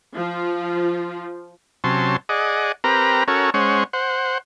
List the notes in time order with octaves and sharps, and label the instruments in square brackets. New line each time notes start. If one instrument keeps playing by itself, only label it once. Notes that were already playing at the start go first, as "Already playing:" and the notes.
[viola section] F3 F4
[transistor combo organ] C3 F#3 C#4 A5 C6
G#4 D5 D#5 F#5
C4 G4 A#4 B4 A#5
C#4 F#4 A4 A#4 C#5
G#3 C#4 C5 C#5 F#5
C5 F#5